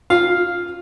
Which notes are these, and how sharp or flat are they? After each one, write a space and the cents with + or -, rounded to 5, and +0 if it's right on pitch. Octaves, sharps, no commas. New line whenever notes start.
F4 +0 F5 +0